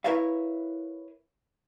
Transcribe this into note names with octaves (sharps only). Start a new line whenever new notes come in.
E4 A#4 B4 C#5 E5 F5